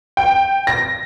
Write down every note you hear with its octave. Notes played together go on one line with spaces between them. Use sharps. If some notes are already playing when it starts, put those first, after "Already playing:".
G5
A#6